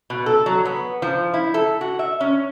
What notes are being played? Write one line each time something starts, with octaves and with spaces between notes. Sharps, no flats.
B2
A4
F#3
B3
F3
E4
A4
F#4
E5
C#4